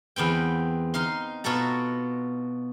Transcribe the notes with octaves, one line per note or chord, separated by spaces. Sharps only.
E2 B3 C4 G5
D#4 F5 C6
B2 F4 F#4 A4 A#5